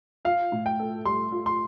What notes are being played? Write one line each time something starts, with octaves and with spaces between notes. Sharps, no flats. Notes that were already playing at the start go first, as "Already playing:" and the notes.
F4 F5
A2
G5
A4
G3 C6
F4
C6